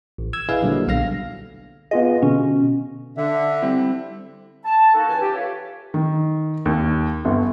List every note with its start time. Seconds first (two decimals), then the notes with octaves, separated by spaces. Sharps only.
0.18 A1
0.33 E6 G#6
0.49 E4 G#4 B4 D#5 F5
0.62 A#2 D3 F#3 G3 A#3
0.87 B1 B2 D3 F5 F6 A#6
1.91 B3 F4 G#4 D#5
2.22 B2 D3 C#4
3.17 D3 E5
3.62 G3 C4 E4
4.65 A5
4.95 A#3 D#4 F#4 A4
5.08 C#2 E3 G#5 A5
5.22 G4
5.34 E4 F4 A4 B4 C#5
5.94 D#3
6.65 D#2
7.25 G1